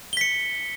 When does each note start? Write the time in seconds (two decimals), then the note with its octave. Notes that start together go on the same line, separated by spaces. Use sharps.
0.13 G7
0.17 B6
0.21 C#7